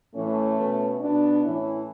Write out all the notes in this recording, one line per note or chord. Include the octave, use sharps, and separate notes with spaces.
A2 E3 A3 C#4
B2
B2 B3 D4
A2 E3 C#4 E4